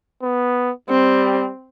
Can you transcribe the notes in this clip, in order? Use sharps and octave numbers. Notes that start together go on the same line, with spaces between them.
B3
G3 C4